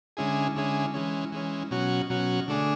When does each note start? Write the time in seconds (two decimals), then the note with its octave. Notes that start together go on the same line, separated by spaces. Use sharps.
0.17 D3 G#3 C#4 E4 G#4
0.55 D3 G#3 C#4 E4 G#4
0.94 E3 G#3 C#4
1.32 E3 G#3 C#4
1.71 B2 F#3 C#4 F#4
2.10 B2 F#3 C#4 F#4
2.48 D3 A3 D4 G#4